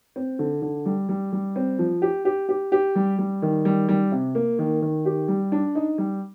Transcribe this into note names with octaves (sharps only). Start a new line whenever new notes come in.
C4
D3
D3
G3
G3
G3
C4
F3
G4
G4
G4
G4
G3
G3
D#3
G3
G3
C3
A#3
D#3
D#3
G4
G3
D4
D#4
G3